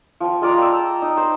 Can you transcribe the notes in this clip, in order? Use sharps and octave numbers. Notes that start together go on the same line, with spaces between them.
F3 G5
G#3 F4 D5 A#5
G5 E6
D#4
C5